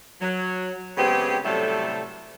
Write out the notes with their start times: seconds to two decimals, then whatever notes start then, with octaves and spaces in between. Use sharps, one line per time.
0.21 F#3
0.97 C#3 G#3 B3 C4 G4
1.44 A2 C3 F#3 G3 A3 A4